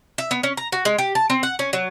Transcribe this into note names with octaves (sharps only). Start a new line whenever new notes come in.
E5
B3
C#4
A#5
F#4
G#3
G4
A5
C4
F#5
C#4
F#3